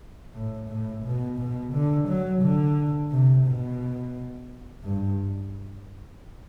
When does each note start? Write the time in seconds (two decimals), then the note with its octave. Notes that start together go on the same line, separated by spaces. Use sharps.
0.34 A2
0.68 A2
1.04 B2
1.39 B2
1.72 D3
2.08 F#3
2.42 D3
3.11 C3
3.46 B2
4.84 G2